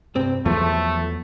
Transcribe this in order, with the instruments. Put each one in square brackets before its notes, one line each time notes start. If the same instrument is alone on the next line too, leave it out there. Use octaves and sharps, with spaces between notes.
[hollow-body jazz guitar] C2 G2 C4
[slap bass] E2 F#3 B3 [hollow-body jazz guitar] F3 [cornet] A3